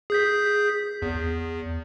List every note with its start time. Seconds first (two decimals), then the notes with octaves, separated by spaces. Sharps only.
0.10 G#4 G6 B6
1.02 E2